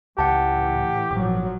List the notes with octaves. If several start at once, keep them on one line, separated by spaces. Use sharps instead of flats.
C#2 A2 E3 G4 F#5 A5
D#1 G#1 A#2 F3 F#3 D6